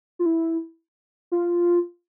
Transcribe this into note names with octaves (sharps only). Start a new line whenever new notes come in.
F4
E4
F4